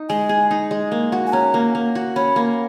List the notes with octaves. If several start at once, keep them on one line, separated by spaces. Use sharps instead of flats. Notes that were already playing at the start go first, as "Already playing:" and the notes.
Already playing: D#4
G#3 G#5
G#4
D#4
G#3
A#3
F#4
G#5
C#4 A#5
A#3
A#3
F#4
C#4 B5
A#3